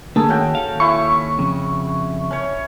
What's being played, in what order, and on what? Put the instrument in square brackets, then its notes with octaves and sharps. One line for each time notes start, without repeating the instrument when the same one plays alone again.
[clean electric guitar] D3 A3 [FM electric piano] A#3 [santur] G#4 A4
[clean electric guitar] D#3 [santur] C#4 F#4 G5
[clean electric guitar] D#2 A4 F5
[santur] E4 G#5 [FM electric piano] C#6
[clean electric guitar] F2 C#3
[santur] C#4 C#5